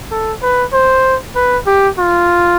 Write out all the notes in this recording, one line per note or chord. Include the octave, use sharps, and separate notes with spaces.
A4
B4
C5
B4
G4
F4